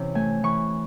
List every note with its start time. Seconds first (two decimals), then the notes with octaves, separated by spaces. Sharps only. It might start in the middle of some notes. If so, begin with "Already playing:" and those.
Already playing: C3 E3 C#4
0.15 A3 G#5
0.43 E3 C#6